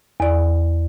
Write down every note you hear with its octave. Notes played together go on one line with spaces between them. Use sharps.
E2 D5